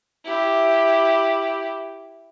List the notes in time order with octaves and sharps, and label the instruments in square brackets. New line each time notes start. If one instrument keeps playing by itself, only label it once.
[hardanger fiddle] E4 G4